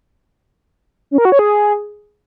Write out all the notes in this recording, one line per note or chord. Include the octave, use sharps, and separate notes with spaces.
C#4
A#4
F#4
C#5
G#4